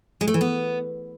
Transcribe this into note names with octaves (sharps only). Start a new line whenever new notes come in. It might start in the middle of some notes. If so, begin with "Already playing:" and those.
G#3
A3
E3
B3